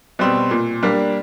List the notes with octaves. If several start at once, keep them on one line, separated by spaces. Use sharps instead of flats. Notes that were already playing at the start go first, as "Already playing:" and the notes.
B2 G3 C4
A#2
G3 A#3 D4